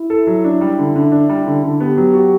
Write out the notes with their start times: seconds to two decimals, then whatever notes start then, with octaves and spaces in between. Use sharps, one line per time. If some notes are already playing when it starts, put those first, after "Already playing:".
Already playing: E4
0.10 A4
0.27 F#3
0.44 D4
0.61 G3
0.79 D3
0.95 D3
1.12 D4
1.29 G3
1.46 D3
1.63 D3
1.80 B3 G4
1.97 F#3
2.14 F#4